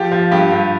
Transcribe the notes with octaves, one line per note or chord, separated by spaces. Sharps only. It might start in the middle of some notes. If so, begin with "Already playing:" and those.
Already playing: F3 G4
F3
G2 G4
G2